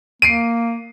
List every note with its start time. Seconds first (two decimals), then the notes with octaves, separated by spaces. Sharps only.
0.22 A#3 C7 D7 D#7